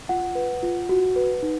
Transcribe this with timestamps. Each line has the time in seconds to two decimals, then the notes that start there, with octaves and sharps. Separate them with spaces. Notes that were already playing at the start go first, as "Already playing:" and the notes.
0.09 F4 F#5
0.35 B4
0.63 F4
0.89 F#4
1.16 B4
1.43 D#4